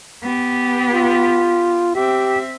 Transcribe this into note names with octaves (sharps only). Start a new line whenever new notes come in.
B3 G4
F4
C4 G4 E5